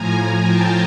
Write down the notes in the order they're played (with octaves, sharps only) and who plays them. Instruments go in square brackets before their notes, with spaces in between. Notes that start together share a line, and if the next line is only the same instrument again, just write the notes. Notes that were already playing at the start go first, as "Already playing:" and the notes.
Already playing: [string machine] A2 F3 G#5 A#5
G#5 A#5
G5 A5